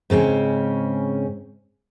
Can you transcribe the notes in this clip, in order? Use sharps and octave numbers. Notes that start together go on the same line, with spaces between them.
G#2 C#3 C4 C#4